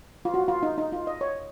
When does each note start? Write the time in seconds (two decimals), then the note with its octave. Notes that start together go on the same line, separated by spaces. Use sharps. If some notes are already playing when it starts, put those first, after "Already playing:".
0.25 F4
0.34 F#4
0.48 F4
0.63 D#4
0.78 D#4
0.93 F4
1.07 D#5
1.21 C#5